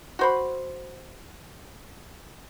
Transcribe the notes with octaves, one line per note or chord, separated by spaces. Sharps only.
F#4 C5 B5